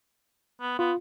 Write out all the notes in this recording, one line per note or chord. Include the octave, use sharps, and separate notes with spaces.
B3
B3 F4